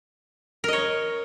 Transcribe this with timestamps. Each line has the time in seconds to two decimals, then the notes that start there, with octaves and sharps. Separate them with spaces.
0.64 A#4
0.68 D#5
0.73 C#5